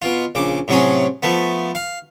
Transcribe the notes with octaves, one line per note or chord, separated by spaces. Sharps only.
B2 F4
A#1 C#3 D6
A2 C3 F#3 C#4 G#4
F3 A3 B3
F5